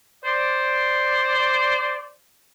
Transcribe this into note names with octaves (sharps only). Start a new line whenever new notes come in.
C5 D5